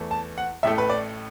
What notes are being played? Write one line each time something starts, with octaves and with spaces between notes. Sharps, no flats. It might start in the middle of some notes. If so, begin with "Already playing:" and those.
Already playing: E2 E3 A3
A5
F#5
A1 A2 A3 E5
B4
D5